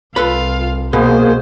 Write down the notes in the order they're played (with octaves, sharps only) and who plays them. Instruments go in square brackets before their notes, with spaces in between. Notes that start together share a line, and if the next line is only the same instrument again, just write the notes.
[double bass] C2 [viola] F4 F5 [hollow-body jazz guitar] A4 B4 B5
[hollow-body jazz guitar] B2 [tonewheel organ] A#3 G#4 [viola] C5